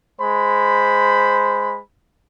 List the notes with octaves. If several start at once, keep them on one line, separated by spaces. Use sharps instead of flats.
G#3 C5 B5